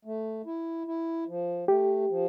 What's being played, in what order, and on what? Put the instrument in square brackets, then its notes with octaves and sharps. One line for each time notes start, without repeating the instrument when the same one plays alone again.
[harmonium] A3
E4
E4
F3
[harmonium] A3 [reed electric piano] G4
[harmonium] F3